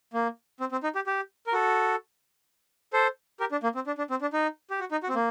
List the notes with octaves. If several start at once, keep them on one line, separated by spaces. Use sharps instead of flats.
A#3
C4
C4
D#4
G4
G4
A#4
F#4 A4
A4 C5
G4 A#4
D4
A#3
C4
D4
D4
C4
D4
D#4
G4
F#4
D#4
F#4
C4
A#3